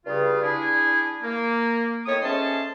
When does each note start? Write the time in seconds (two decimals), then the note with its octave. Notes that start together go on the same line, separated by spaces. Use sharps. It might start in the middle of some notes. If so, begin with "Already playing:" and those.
0.06 G2 C#3 F4
0.42 D4 E4 G#4
1.22 A#3
2.06 A2 D#3 B3 C#5 D#6
2.22 G#3 A3 C#4 C5 A5 C6